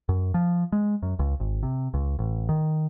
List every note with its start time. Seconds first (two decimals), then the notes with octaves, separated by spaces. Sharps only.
0.09 F#2
0.34 F3
0.72 G#3
1.03 F#2
1.19 C#2
1.40 G#1
1.63 C3
1.94 C#2
2.19 A1
2.49 D#3